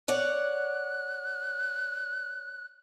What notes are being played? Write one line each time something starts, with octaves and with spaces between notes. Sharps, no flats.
C#5 D5 F#5 F#6